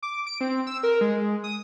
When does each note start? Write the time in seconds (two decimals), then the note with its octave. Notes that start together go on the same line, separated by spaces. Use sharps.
0.03 D6
0.27 D7
0.41 C4
0.67 E6
0.83 A#4
1.01 G#3
1.44 D#6